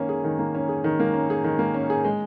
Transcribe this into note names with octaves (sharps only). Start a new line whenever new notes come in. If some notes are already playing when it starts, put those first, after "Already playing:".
Already playing: D#3 A#3 C#4
G#4
D#3
A#3
C#4
G#4
D#3
A#3
C#4
G#4
D#3
A#3
C#4
G#4
G#3